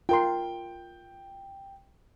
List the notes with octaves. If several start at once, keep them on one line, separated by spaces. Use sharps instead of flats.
F4 A#4 G5 C6